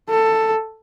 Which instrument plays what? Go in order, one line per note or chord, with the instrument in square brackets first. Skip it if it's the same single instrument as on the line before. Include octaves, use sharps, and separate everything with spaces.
[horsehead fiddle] A4